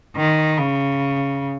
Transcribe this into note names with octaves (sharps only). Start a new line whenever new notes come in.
D#3
C#3